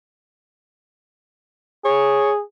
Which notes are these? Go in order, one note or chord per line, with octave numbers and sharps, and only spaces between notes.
G#4 C#5